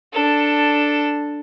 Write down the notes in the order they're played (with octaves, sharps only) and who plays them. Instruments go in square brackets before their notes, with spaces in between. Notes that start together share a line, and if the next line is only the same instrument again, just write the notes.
[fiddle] D4 A4